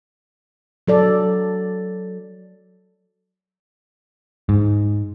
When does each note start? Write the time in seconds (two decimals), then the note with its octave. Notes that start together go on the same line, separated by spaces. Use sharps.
0.88 F#3 A4 D5
4.49 G#2